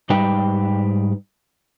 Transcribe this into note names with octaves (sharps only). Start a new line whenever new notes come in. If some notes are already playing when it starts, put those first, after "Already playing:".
G#2 G3 D#4 B4 G5